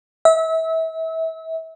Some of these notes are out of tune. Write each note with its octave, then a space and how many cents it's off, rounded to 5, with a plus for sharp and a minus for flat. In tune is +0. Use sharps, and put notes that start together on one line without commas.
E5 -30